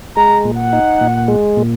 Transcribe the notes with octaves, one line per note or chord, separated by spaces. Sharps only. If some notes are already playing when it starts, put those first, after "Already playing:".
G#3 A#5
A#2
F#5
D#4
A#2
G#3
A#2